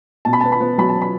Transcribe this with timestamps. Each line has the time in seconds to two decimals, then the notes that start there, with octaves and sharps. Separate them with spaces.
0.25 B2 A5
0.33 B5
0.41 B3 A5
0.52 B5
0.61 B3
0.78 F#3 B5
0.89 A5
0.96 B3
1.01 B5